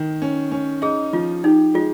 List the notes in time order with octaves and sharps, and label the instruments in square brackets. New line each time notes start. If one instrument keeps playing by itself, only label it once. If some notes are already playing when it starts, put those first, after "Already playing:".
Already playing: [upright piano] D#3
C#4
C#4
[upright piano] D#4 [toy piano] G#4
[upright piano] F3 [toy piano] F4
[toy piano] D#4 [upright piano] G4
[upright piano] G#3 [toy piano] F4